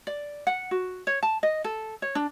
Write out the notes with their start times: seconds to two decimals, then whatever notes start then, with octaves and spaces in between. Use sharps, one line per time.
0.07 D5
0.47 F#5
0.71 F#4
1.07 C#5
1.23 A5
1.43 D#5
1.64 A4
2.02 C#5
2.15 D4